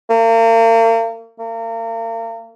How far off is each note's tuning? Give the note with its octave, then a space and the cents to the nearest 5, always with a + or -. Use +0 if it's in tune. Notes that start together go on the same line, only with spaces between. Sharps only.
A#3 -40
A#3 -40